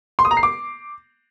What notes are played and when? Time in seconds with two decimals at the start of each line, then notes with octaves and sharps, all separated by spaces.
0.19 C6
0.25 D#6
0.31 A#5
0.37 C7
0.43 D6